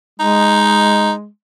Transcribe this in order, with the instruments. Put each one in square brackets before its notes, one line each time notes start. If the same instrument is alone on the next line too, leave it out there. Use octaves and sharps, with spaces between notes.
[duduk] G#3 [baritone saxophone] D#4